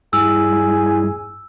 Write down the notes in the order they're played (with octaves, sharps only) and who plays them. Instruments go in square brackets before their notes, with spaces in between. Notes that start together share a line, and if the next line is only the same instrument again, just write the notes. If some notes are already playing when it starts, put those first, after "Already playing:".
[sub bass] G2 [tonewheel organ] G3 E4 [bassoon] G#4 [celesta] E6